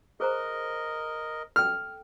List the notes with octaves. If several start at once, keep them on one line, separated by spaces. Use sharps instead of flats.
G#4 A#4 C5 D#5 A#5
A4 G5 F6